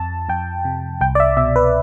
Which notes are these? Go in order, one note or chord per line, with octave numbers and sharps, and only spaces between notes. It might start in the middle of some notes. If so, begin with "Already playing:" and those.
Already playing: F2 F3 A5
F2 G5
C3
C2 G5
D5
E5
B2 E5
B4